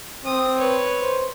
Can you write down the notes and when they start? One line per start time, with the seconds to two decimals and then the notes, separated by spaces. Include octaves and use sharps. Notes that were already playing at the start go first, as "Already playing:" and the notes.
0.25 C4 D#6
0.58 B4 C#5
0.99 C5